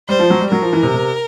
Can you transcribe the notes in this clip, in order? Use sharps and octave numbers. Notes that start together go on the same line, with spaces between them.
G3 C5
F3
F#3
G3
F#3 A#4
F3
E3
C3
C3